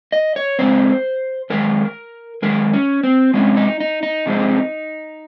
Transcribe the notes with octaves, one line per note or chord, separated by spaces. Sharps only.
D#5
C#5
F2 C#3 G#3 C4 C5
F#2 D#3 G#3 A#4
F#2 D#3 G#3 A#4
C#4
C4
C3 F3 G#3 C4 C#4
D#4
D#4
D#4
C3 F3 G#3 C4